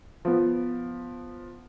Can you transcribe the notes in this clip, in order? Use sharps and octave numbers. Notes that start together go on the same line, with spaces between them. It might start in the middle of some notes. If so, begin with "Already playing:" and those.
F3 B3